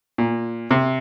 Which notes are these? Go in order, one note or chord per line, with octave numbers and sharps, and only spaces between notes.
A#2
C3